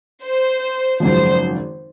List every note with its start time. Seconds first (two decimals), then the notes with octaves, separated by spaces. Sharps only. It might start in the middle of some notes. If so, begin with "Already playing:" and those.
0.23 C5
1.00 G#1 F#2 C#3 F3 C5